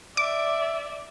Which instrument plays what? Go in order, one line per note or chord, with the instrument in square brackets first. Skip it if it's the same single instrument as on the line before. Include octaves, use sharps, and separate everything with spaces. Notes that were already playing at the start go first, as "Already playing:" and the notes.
[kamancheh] D5 E5 [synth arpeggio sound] D6